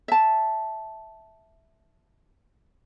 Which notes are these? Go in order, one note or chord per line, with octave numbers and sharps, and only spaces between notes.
E5 A5